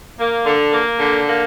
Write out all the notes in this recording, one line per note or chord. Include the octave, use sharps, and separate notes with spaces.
A#3
D3
A#3
D3
A#3